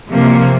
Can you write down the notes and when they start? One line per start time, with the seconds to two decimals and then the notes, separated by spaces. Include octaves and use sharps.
0.10 C3 F3 A#3